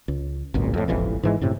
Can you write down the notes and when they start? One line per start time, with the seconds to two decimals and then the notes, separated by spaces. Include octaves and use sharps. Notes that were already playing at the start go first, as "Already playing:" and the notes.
0.08 C#2
0.54 G#1 C#2 F#2 A#2
0.74 F2 A2
0.88 E1 A1 F2 E3
1.23 G#2 E3 G#3
1.41 F#2 A2 C3